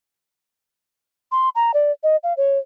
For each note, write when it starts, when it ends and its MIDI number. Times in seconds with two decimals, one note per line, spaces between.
1.32 1.49 84
1.55 1.72 82
1.74 1.92 74
2.03 2.16 75
2.23 2.33 77
2.37 2.58 73